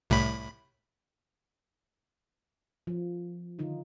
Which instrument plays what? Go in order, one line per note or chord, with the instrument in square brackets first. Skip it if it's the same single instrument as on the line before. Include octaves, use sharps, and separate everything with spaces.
[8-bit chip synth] C2 A2 B5
[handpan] F3
D3 D#3 D#4 F4